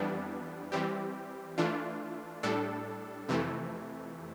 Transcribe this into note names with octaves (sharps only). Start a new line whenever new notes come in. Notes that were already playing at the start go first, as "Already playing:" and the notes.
Already playing: F2 E3 G3 B3 D4
E3 G3 C4 G4
E3 A3 D4 F4
A2 G3 D4 A4
F2 C3 E3 A3